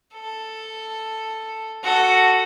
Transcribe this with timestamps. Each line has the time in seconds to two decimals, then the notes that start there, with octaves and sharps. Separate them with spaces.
0.14 A4
1.84 F#4 A4